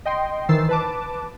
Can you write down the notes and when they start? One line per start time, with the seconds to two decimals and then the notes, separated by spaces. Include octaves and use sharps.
0.05 D#5 G5 C6
0.49 D#3 E3 C5 E6 A6 C7
0.69 B4 A5 D6